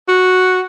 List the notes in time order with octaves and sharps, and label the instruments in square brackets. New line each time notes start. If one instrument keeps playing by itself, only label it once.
[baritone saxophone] F#4